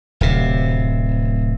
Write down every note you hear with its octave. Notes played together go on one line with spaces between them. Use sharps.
D1 C3